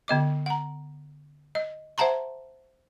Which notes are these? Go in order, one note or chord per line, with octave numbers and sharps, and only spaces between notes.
D3 B3 D#5 D6
F#5 A#5
D#5
C5 E5 F#5 A5 A#5 C6